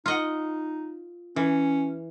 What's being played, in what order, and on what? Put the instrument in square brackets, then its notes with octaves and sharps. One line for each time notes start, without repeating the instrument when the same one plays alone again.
[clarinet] D#4 [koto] F4 D#5 F#5
[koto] E3 [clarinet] C#4